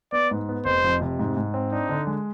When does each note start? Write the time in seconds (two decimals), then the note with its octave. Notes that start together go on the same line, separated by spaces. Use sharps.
0.12 B3 D5
0.31 G#2
0.49 B3
0.65 F1 C5
0.84 F2
1.01 C3
1.19 G#2
1.37 G#2
1.54 C4
1.72 D4 D#4
1.89 D3
2.07 G#3